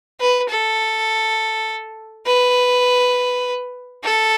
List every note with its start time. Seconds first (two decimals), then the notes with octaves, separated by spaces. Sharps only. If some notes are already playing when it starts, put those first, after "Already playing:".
0.20 B4
0.49 A4
2.27 B4
4.04 A4